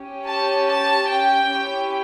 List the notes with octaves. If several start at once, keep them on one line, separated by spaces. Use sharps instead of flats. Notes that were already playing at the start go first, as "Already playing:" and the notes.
Already playing: C#4 G4
A5
A5
G5
C#4 E4 G4